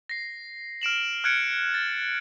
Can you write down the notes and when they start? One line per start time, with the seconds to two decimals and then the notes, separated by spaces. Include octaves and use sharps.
0.09 A#6 C7
0.82 F6 D7 E7 F#7
1.24 F6 F#6 G#6 C#7 D7
1.74 A6